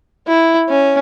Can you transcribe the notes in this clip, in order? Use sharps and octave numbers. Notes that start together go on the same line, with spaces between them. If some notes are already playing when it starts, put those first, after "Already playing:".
E4
C#4